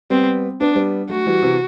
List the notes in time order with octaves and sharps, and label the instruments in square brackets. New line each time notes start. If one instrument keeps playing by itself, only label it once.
[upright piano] G3 B3 [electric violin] C4
[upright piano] B3 [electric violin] D4
[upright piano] G3 B3
[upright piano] F#3 A3 [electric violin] F#4
[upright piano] E3 G3
C3 E3